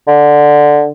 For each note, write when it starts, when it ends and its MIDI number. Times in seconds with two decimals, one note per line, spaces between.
0.07 0.89 50